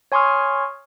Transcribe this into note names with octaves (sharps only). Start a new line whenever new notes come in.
C#5 G#5 C6 C#6 D#6 F6